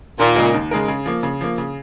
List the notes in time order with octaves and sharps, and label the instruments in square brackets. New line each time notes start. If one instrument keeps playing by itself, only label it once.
[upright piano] D#2 [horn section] A#2
[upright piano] C#3 G#3 D#4 A#4
D#2
C#3 G#3 D#4 A#4
C#3
F3 A#3
C#3
F3 A#3
C#3